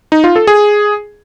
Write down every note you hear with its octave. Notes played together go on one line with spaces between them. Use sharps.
D#4
F4
A4
G#4